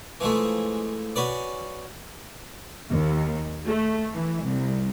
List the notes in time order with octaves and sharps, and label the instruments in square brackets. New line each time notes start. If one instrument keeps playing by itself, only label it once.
[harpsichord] E3 F3 G#3 A3
C#4 F#4 B4 D5
[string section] D#2
A3
E3
C2